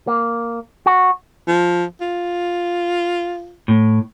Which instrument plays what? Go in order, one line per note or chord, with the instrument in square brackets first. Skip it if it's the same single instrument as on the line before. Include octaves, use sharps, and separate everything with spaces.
[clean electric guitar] A#3
F#4
[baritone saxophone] F3
F4
[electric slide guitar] A2